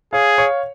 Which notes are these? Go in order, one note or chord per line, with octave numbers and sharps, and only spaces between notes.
G#4 C#5 F5
C#5 F5